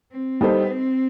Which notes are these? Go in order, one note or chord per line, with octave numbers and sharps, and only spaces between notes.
C4
G3 B3 D#4 A4 C5
C4